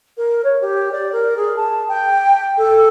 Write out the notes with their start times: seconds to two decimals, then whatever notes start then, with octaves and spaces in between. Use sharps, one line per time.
0.17 A#4
0.44 C#5
0.61 G4
0.92 D5
1.12 A#4
1.36 G#4
1.56 A5
1.88 G5
2.57 A4